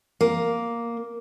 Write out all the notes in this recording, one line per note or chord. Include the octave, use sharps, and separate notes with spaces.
A#3